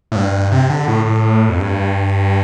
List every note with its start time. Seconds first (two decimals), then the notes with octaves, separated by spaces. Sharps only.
0.12 A2
0.16 G2
0.52 C3
0.70 D3
0.88 A2
1.06 A2
1.49 F2
1.60 G2